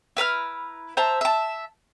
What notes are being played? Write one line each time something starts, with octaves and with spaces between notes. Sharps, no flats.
E4 B4 A#5 F6
C5 E5 A5 A#5
E5 A5